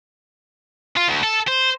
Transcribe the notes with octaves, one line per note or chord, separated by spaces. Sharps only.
F4
D2
A4
C5